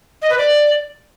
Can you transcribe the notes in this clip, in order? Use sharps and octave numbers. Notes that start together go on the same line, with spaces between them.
D#5
B4
D5